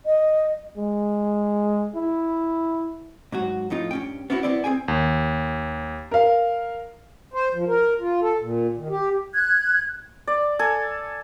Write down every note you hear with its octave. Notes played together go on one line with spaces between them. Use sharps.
D#5
G#3
E4
G#2 F#3 F#4
F2 A2 D#4 F4
G2 C#4 G5
B3 C#4 D4 E4 F#4
C2 B3 C4 E4 D5
C4 G#4 G5 G#5
D#2
A#4 F5
C5
F3
A#4
F4
A4
A#2
D#3
G4
F#6 G#6
D5
A4 G#5